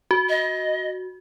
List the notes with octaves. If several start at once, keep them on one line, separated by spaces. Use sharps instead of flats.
F#4
D#5